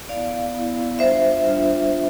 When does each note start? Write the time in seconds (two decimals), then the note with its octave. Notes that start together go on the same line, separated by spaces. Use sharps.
0.09 B3 E4 D5 F5
0.55 B3 E4
0.99 G3 D4 F4 C5 E5
1.44 G3 D4 F4